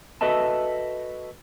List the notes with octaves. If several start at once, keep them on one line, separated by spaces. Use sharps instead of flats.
F#4 A4 B4 D#5 E5 A5